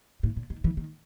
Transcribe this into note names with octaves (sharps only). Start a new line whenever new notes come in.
A2
A#2
D#3
E3
D#3